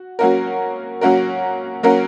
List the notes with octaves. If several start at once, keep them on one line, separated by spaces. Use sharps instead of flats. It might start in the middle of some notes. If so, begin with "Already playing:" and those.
Already playing: F#4
F#3 A#3 C#4 F#4 A#4
F#3 A#3 C#4 F#4 A#4
F#3 A#3 C#4 F#4 A#4